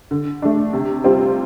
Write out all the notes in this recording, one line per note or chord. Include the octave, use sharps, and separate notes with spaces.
D3
A3 D4
C3
G3 C4 F4